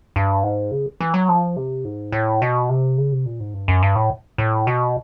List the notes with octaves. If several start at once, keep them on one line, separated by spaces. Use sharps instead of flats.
G2
G#2
C#3
E3
F#3
F3
C3
G#2
A2
B2
C3
C#3
C3
A#2
G#2
G2
F#2
G2
A2
A2
B2